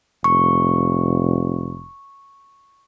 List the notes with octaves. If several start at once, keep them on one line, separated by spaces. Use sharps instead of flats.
F1 C#6